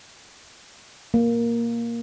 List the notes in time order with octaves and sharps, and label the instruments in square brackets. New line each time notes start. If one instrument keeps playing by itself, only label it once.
[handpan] A#3